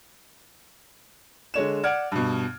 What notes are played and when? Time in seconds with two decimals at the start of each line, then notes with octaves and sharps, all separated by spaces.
1.54 D3 G#3 C#5 E7
1.83 D5 F#5 F6 G#6 D7
2.12 G2 B2